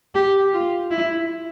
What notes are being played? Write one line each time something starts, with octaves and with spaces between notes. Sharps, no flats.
G4
F4
E4